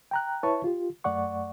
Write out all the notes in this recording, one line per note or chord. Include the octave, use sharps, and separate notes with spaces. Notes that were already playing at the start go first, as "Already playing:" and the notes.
G5 A#5 F#6
E4 B4 C#5 E5 A5 C#6
F4 G4
F#2 A3 D5 F#5 C#6